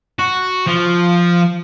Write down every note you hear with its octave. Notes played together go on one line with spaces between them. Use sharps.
F#4
F3